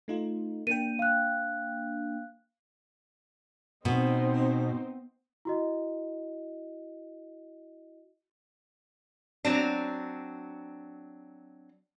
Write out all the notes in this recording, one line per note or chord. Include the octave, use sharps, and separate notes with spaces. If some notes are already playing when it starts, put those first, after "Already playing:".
A3 D#4 F4
A#3 D4 G5 D#7
F5 F#6
B2 C4 D#4 C5
E4 F#4 D#5
F#3 C4 D4